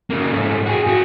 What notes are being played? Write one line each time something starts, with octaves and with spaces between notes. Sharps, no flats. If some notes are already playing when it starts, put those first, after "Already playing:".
C#3 A#3
G#2 A3
F#4 G#4
F#4 G#4